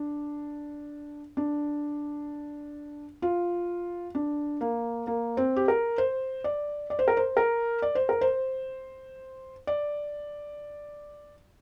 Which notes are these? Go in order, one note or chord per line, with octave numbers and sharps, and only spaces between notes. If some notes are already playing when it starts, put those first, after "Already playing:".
Already playing: D4
D4
F4
D4
A#3
A#3
C4
G4
A#4
C5
D5
D5
C5
A#4
C5
A#4
D5
C5
A#4
C5
D5